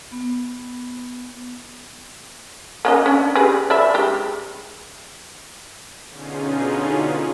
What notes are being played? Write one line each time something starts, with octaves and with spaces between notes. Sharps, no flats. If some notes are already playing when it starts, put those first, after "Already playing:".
B3
A#3 C#4 D#5
C#4 D4
G3 G#4 B4
D5 E5 B5
G#3 G4
B2 D3 C#4 D#4 F4 G#4